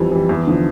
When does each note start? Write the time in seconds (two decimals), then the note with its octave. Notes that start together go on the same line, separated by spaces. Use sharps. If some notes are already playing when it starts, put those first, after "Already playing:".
Already playing: F2 E3 G3
0.12 E3 G3
0.29 E2
0.47 D3 F3